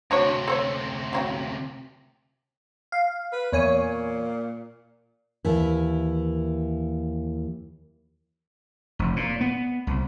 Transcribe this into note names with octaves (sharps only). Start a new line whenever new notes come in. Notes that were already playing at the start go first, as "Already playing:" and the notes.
D2 C3 D4 F#4 C#5
A4 C5 C#5
F#3 F4 G4
F5
B4
E2 A#2 C#5 G#5
D#2 E3
F1
A#2
B3
C2